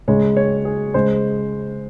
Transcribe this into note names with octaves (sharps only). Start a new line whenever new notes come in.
C#3 G#3 C#5
C#5
G#4
C#3 G#3 C5